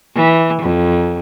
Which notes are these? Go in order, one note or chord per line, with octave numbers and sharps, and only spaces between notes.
E3
F2